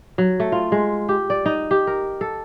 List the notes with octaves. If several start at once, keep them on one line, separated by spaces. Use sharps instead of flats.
F#3
A3
F4
G#3
G4
D5
D#4
G4
A#4
A4